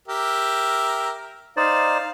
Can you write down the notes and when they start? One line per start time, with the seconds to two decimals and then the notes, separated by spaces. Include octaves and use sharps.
0.08 G4 A#4 E5
1.57 D#4 C5 D5 F5